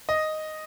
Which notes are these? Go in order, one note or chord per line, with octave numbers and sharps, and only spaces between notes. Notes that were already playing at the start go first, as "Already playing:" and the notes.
D#5